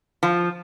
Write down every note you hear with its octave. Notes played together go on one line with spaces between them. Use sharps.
F3